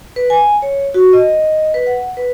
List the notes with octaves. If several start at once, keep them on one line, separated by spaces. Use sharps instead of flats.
B4
G#5
C#5
F#4
D#5
B4
F#5
B4